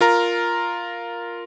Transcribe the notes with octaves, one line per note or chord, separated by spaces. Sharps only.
F4 A#4 A#5